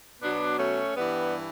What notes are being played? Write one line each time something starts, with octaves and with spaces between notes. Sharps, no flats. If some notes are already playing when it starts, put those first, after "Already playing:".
B2 F#3 B3 D4
A3 C#4
G2 E3 G3 B3